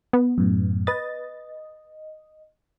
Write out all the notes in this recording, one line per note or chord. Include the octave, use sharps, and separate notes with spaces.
B3
F#2 A2
B4 D#5 A6